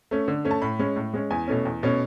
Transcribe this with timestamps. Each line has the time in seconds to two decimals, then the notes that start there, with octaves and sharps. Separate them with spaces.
0.11 A3 C#4
0.28 D3
0.45 A3 C#4
0.51 A5
0.62 A2 B5
0.79 G#3 C#4
0.96 A2
1.14 G#3 C#4
1.31 E2 G#5
1.48 B2 A3 C#4
1.65 E2
1.83 B2 A3 C#4